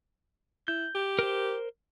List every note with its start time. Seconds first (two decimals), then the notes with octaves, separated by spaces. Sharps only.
0.68 E4 G6
0.95 G4
1.19 A#4 C5